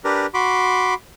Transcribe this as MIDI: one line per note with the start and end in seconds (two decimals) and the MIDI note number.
0.04 0.26 62
0.04 0.26 67
0.04 0.26 70
0.04 0.26 71
0.34 0.94 66
0.34 0.94 83
0.34 0.94 84
0.34 0.94 86